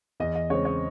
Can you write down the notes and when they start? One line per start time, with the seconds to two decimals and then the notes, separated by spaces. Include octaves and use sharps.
0.20 E2 D#5
0.35 D#5
0.50 C#3 G#3 C4 C#5
0.65 C#5